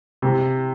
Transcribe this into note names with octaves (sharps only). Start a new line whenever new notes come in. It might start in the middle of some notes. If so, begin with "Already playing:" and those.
C3